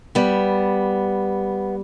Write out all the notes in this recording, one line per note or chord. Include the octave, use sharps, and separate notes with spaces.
G3 B3